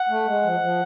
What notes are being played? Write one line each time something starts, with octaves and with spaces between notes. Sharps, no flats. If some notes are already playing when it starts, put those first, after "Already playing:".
Already playing: F#5
A3
G#3
F3
F3